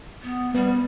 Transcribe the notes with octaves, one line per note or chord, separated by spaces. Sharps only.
B3
G3 B3